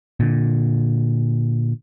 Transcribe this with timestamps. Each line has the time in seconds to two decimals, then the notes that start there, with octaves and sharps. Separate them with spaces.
0.20 A#2 D3